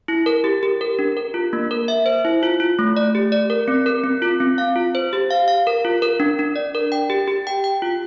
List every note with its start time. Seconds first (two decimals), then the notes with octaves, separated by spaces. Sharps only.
0.08 E4
0.26 A#4
0.44 G4
0.63 G4
0.81 A#4
0.99 D4
1.17 A#4
1.34 F4
1.53 A#3
1.71 A#4
1.88 E5
2.06 C5
2.25 E4
2.43 F4
2.60 F4
2.79 A3
2.97 D5
3.15 G4
3.32 D5
3.50 A#4
3.68 C4
3.86 A#4
4.04 C4
4.22 F4
4.40 C4
4.58 F5
4.76 F4
4.95 C5
5.13 G4
5.31 F5
5.48 F5
5.67 A#4
5.85 F4
6.02 A#4
6.20 D4
6.39 D4
6.56 D5
6.75 A#4
6.92 G5
7.10 G4
7.28 G4
7.47 G5
7.64 G5
7.82 F4